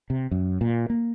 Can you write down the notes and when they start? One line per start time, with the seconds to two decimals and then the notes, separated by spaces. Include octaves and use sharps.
0.10 C3
0.31 F#2
0.61 A#2
0.90 A#3